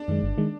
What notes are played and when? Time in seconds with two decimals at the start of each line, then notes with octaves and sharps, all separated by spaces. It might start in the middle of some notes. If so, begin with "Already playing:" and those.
Already playing: D4
0.08 F#2 D#3 G#3
0.22 G1
0.38 D#3 G#3